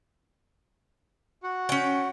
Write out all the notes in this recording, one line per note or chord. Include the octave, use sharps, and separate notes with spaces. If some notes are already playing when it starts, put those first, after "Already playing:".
F#4 F#5
C#4 G5